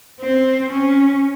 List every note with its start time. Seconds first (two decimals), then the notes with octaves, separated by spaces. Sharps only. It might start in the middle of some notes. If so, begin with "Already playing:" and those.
0.20 C4
0.71 C#4